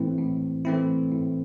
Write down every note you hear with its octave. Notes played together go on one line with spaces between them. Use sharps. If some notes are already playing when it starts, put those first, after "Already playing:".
Already playing: A2 E3 A3 C4 E4
A2
E3 A3 C4 E4
A2